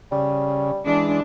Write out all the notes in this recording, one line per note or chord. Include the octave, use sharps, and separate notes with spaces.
C#3 G3
E3 G#3 D4